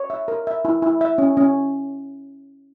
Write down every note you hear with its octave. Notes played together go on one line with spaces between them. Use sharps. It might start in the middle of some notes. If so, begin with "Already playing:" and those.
Already playing: C#5
E5
A#4
E5
E4
E4
E5
C#4
C#4